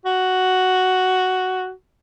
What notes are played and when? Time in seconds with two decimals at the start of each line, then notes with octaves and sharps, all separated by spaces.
0.05 F#4